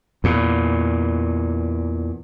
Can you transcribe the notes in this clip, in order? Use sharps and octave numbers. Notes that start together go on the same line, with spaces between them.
E2 A#2